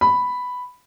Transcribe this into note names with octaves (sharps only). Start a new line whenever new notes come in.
B5